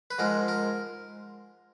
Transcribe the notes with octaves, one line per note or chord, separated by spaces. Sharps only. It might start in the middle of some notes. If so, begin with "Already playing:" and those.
B4
G#2 F3 G#3 A#4
A#4